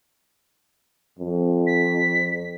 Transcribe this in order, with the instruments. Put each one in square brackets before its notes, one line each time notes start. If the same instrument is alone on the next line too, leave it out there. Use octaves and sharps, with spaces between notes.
[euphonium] F2
[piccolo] B6